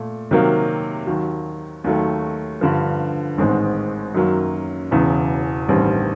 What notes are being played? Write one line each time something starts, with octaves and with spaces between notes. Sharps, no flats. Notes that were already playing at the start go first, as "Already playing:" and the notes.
Already playing: A#2 A3
C3 D#3 F#3 A#3
D#2 D#3 F#3
D#2 D#3 F#3 A3
G2 D3 F3
A1 G#2 D#3 G#3 C4
F#2 D#3 F#3 A#3
E1 E2 C#3 E3
A1 G2 D#3 G3 C4